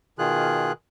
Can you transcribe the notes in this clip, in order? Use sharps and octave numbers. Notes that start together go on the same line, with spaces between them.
B2 D#3 F4 G#4 F#6